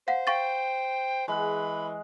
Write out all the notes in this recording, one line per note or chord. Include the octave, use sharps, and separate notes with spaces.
C5 F5 F#5
F5 G5 C#6 A6
E3 G#3 F#5 B5